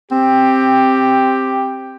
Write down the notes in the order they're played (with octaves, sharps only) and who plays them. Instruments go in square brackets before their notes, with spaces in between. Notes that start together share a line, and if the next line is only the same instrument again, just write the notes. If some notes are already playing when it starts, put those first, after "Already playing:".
[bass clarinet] C4 [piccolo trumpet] G4